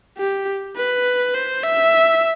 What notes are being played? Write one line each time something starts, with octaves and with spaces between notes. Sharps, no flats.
G4
B4
C5
E5